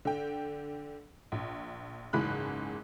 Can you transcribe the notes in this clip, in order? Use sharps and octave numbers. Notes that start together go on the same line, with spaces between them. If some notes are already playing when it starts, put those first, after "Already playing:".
D3 G5
A#1
F#1 C#2 G#2 E3 B5 F#6